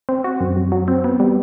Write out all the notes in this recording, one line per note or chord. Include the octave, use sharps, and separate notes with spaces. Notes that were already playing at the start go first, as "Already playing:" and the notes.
C4
F#4
F#2
F#2
F#3
C4
B3
G3